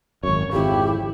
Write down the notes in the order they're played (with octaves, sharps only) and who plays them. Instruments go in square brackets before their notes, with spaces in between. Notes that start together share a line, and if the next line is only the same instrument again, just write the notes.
[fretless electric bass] G#1 F#2 [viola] C#5
[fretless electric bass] G#1 F2 C#3 [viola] E4 [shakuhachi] G4